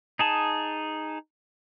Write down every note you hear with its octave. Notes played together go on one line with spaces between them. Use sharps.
D#4 G#4 A5